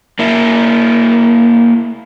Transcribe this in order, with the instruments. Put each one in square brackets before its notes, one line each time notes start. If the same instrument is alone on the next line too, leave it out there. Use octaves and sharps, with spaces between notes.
[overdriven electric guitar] A#3 E4